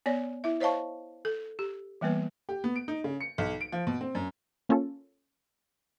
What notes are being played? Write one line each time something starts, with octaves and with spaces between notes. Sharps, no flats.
B3 C#5 D5
E4 E5
C5 C#5 D#5 F5 A5 C#6
A4
G4
E3 G3 A#3 B3 B4
G4
B3
D7
D#4
C#3
C#7
B1
D7
F3
B2
C4
F#2
A#3 C#4 F4 A4